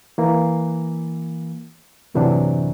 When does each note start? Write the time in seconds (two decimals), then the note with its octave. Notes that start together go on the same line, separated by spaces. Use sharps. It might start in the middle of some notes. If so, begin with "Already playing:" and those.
0.18 E3 A#3
2.14 F#2 A2 C3 E3 F#3 D4